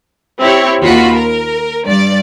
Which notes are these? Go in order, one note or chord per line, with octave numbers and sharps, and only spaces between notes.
C4 E4 G4 C#5
D#2 F4 F#4 B5
A#4
G2 D5